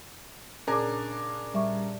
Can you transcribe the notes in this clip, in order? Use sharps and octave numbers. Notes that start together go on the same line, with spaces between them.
A#2 C#3 D4 G#4 A#4
A#2 G3 E5 C#6